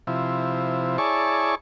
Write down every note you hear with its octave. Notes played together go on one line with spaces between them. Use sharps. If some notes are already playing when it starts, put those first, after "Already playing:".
C3 F3 E4
E4 G#4 C#5 D5 A5 C#6